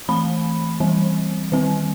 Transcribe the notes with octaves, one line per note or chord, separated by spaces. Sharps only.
E3 A3 C4 B5
E3 G3 C4
D#3 G3 C4